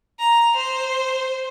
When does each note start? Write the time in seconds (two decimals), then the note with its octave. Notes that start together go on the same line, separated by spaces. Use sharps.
0.20 A#5
0.56 C5